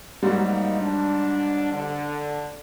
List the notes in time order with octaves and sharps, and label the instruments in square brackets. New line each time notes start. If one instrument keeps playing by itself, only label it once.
[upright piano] G#2 F#3 G3 [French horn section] A#3 D#4
[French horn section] D4
D3